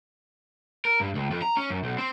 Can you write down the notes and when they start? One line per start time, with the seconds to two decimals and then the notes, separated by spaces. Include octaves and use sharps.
0.85 A#4
1.00 G2
1.15 C#2
1.31 F2
1.42 A#5
1.57 C#4
1.70 F#2
1.84 B1
1.98 C4